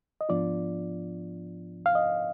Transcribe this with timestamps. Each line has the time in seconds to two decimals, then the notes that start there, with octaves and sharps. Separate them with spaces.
0.21 D#5
0.29 G#2 F3 B3 D4 F4 D5
1.86 F5
1.95 D#5